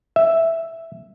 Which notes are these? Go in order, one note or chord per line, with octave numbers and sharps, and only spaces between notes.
E5